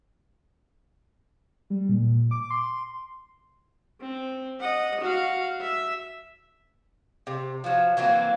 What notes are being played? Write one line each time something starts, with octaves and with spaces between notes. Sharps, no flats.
G3
A#2
D6
C6
C4
D#5 F#5
F#4 F5
E5
C3
F3 F#3
E3 F#3 A#3 C4